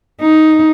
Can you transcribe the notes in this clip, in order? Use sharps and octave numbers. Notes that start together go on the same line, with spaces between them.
D#4